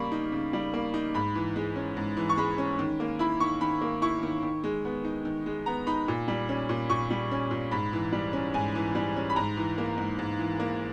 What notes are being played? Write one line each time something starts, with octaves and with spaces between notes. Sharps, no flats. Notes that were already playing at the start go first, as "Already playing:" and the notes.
Already playing: C#3 G3 A#3 B5 C#6
D#4
C#3
G3
A#3
D#4
G#2 B5
E3
G#3
C#4
G#2
E3
C#6
G#3 B5
C#4
D#3
A#3
E4 B5
D#3 C#6
D#3 B5
A#3
E4 C#6
D#3
D#3
G#3
B3
D#4
D#3
G#3
B3 A#5
D#4 B5
A#2
G3
C#4
A#2
A#2 C#6
G3
C#4
A#2
G#2 B5
E3
G3
C#4
G#2 G#5
E3
G3
C#4
B5
G#2 A#5
E3
A#3
G#2
G#2
E3
A#3